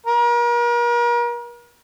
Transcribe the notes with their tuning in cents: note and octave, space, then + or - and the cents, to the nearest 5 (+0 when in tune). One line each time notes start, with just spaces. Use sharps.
A#4 +40